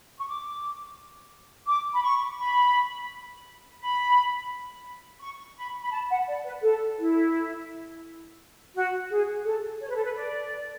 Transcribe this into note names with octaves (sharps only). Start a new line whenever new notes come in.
C#6
D6
D6
B5
C#6
B5
B5
C#6
B5
B5
A5
F#5
D5
B4
A4
E4
F#4
G#4
A4
C#5
B4
A4
B4
D5